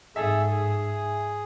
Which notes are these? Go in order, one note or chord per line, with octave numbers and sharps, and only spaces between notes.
G#2 G#4 A4 E5
G#4